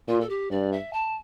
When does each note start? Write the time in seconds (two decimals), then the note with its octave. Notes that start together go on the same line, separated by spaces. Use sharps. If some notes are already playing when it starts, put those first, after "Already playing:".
0.08 A#2 F4
0.20 A4
0.29 G4
0.51 G2 D5
0.72 E5
0.93 A5